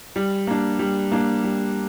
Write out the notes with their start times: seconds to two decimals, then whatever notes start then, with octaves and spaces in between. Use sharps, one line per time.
0.16 G3
0.47 A#3 D4
0.79 G3
1.12 A#3 D4
1.44 G3